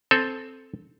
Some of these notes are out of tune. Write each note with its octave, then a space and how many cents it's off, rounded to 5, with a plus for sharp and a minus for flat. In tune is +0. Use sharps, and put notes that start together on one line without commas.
C4 +0 A4 +0 G#5 +0